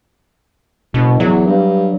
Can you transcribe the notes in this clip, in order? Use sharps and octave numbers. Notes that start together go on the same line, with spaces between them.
F#1 B2
E2 F#3
G2